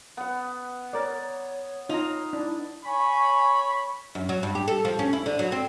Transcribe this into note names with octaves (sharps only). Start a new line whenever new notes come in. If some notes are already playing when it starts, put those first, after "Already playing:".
B3 F#5
A#4 C#5 D5
D#4 F4 A#5
D4 E4
C#5 G#5 B5 C#6
F#2
F#3
G2
G4
A4
F3
C#4
E4
D3
F#3
C4